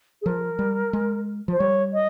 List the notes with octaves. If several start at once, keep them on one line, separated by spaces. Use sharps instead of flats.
G#4
F3 A#4
G3
G#3
F3 C5
G3 C#5
D#5